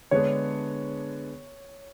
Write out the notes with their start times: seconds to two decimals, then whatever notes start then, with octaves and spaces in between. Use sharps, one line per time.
0.11 D3 G#3 B3 D4 G#4 C#5